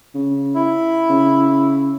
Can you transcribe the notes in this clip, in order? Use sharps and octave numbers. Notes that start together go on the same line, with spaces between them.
C#3
E4
C#3